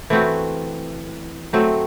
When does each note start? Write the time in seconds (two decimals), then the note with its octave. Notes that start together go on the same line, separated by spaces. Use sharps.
0.10 E3 A3 C4 F#4
1.53 F#3 A3 C4